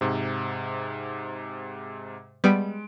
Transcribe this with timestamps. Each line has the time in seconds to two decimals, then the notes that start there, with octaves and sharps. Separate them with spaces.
0.01 G#2 C3
2.44 G3 G#3 B3 D7